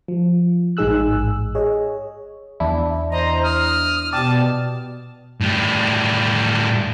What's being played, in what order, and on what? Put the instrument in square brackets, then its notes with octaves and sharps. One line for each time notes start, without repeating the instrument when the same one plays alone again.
[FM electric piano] F3
A1 G#2 D#4 G#4 E6 F#6
G#4 C#5 D#5
E2 D4 E4
[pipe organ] C5 A#5 [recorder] D#5
[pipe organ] D#6 [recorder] F6
[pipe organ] B2 [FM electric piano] G4 D5 [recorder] A5
[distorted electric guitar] A2 G3